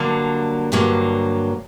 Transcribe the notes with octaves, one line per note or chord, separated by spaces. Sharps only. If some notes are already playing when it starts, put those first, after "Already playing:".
Already playing: G2 D3 F#3 A#3
G2 D3 F#3 A#3